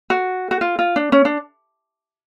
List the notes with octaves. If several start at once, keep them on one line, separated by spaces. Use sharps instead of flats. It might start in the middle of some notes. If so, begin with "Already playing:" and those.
F#4
F#4
F4
F4
D4
C#4
D4